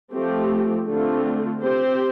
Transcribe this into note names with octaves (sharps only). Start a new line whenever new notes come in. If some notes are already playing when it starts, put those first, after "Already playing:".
F3 A3 C4 G4
D3 A3 C4 F4
C4 G4 C5